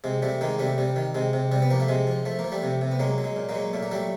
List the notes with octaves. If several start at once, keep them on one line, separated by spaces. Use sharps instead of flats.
C3 G#3
C3 G3 A3
D#3 G#3 A#3
C3 G3 A3
C3 G3
D#3
C3 G#3
C3
C3 G3
B3
F3 A#3
A3
C3 G#3
F3
F3 A3
A#3
F3
G3 A3
C3
C3
B3
F#3 G#3 A#3
F#3
G#3
A#2
G#3 A#3
F#3
A#2 A3
A#3
F#3 G3 A3